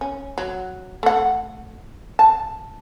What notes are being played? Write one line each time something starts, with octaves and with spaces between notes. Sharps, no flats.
C#4
F#3
A3 F#5
A5